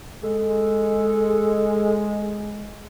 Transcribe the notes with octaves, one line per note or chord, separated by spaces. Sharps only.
G#3 A4